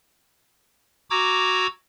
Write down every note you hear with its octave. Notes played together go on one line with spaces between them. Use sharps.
F#4 A#5 D6 E6 G#6